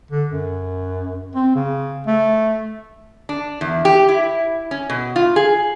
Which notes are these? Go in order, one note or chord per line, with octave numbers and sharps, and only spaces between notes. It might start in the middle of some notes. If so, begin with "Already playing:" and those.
D3
F#2
C4
C#3
A3
D4
E2
G4
E4
C#4
B2
F4
G#4